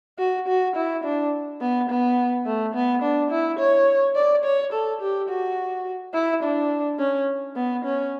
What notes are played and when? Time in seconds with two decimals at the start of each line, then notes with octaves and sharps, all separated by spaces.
0.19 F#4
0.48 F#4
0.76 E4
1.04 D4
1.61 B3
1.90 B3
2.46 A3
2.75 B3
3.02 D4
3.31 E4
3.59 C#5
4.16 D5
4.44 C#5
4.73 A4
5.01 G4
5.29 F#4
6.14 E4
6.43 D4
6.99 C#4
7.56 B3
7.85 C#4